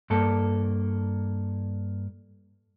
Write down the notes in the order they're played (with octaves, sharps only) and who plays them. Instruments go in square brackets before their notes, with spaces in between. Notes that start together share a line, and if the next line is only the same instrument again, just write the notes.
[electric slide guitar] G2 A#3 A4